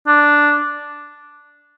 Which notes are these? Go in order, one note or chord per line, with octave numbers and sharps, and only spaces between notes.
D4